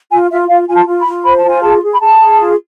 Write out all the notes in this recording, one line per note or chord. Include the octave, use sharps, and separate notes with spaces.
F4 G#5
F4 E5
F4 F5
F4 G#5
A5
F4
B5
F4
C5 B5
A5
F4 G#5
G#4 A5
G#4
B5
G#4 A5
G#4
F4